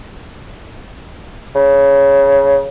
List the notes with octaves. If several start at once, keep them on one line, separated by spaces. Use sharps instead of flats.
C#3